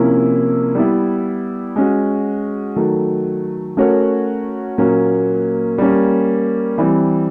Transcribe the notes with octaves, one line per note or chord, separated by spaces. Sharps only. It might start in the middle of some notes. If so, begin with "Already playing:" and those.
Already playing: C3 F3 A#3 C#4 E4
G3 B3 E4
G#3 C#4 F#4
D#3 F#3 A3
A3 C#4 F#4 A#4 C#5
A#2 F#3 A#3 C#4
G3 A#3 C#4
E3 G3 C4